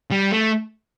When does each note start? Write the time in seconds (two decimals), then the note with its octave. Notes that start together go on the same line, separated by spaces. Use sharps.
0.11 G3
0.31 A3